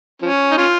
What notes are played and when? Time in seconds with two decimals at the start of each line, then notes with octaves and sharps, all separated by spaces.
0.22 F3 C#4
0.51 D#4
0.58 C#4 F4